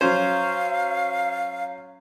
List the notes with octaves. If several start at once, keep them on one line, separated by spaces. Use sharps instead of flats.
F#3 C#4 C5 F5